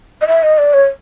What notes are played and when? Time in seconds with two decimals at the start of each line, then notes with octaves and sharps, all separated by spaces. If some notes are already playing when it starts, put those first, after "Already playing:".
0.21 D#5
0.27 E5
0.43 D#5
0.58 D5
0.73 C#5